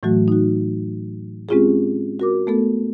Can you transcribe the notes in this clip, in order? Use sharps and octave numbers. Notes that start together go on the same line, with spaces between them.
A2 E3 F#3 A3 F#4
D#4 F#4
G#3 C4 C#4 F4 G4 G#4
F#4 A#4 D6
A3 B3 A4